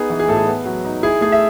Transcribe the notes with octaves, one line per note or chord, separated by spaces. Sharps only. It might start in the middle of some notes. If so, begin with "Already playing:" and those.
Already playing: B3 D#4 G#4
E3
G#4
A2 A4
G#4
B3
F#3
D#4
E4 G#4
A3 G#4
E5